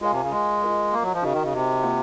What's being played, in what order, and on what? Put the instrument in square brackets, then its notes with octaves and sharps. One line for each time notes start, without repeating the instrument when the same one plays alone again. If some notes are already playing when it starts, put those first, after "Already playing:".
[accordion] G#3 [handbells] F4 A#4 C#5 F5 G#5
[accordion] C3
C#3
G#3
[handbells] F4 A#4 D#5
[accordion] A#3
F#3
F3
[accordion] C#3 [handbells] D#4 F#4 A#4 D#5
[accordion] D#3
C#3
C3
[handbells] A#3 F4 C5 F#5